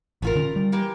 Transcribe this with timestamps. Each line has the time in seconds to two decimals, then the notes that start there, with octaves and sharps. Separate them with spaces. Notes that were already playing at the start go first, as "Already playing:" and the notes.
0.22 A1 A3 F4 A#4
0.35 D3 C#4
0.56 G3
0.72 E3 A#3 G4